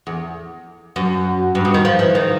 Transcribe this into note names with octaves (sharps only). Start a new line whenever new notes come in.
E2
F#2
G2
B2
D#3
F3
E3
D#3